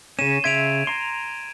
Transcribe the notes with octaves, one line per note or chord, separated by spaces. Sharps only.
C#3 C#4 D#7 E7
C#3 E5 C6 G#6 D7 F7
A#5 C6